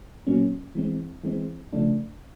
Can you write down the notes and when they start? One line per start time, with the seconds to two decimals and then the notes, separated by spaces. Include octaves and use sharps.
0.27 A#2 F#3 A#3 C#4
0.75 E3 G#3 C4
1.24 E3 G#3 C4
1.73 C#3 F3 A3 D4